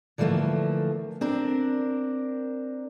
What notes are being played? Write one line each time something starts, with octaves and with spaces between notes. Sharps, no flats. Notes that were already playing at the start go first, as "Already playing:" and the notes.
D3 E3 F3 A3 A#3
C4 D4 A#4